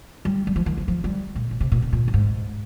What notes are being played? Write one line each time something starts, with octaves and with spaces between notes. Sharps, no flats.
G3
G3
F3
D#3
F3
F3
G3
A#2
A#2
C3
A#2
C3
A#2
G2
G#2